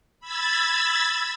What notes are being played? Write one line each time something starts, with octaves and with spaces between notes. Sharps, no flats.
B5 E6 G#6 A6